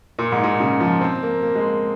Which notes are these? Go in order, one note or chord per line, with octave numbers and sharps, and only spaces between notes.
A#2
G#2
A#2
C#3
F3
C4
A#3
A#3
G#3
A#3